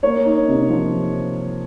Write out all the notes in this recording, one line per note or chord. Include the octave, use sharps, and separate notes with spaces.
A#3 C#5
D#4
C3
F3